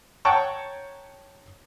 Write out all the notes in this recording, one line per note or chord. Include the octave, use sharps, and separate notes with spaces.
C#5 F#5 G5 A5 A#5 C#6